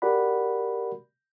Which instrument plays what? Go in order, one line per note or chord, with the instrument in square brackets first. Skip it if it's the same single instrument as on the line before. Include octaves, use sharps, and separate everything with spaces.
[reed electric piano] F#4 G4 A#4 D5 F#5 B5